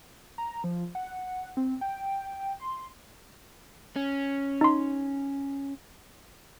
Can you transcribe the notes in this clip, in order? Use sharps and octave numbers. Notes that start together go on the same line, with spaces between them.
A#5
F3
F#5
C4
G5
C6
C#4
D#4 C6